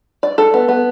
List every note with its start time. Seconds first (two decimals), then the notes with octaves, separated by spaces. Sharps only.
0.23 D5
0.38 A4
0.54 B3
0.68 B3